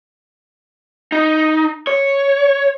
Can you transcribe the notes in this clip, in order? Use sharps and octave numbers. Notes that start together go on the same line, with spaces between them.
D#4
C#5